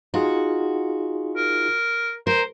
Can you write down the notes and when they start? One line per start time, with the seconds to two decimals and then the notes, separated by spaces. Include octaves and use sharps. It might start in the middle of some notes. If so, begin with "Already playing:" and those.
0.14 D#4 F4 F#4 G#4
1.37 A#4
2.27 A#4 C5